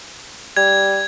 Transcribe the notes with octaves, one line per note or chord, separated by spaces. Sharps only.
G3 G#6